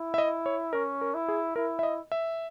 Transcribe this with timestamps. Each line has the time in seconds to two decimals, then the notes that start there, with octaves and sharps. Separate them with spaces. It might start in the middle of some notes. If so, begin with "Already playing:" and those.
Already playing: E4
0.14 E5
0.18 D#5
0.46 C#5
0.73 C#4 A#4
1.01 A#4
1.14 E4
1.28 G#4
1.56 E4 A#4
1.79 E5
1.83 D#5
2.12 E5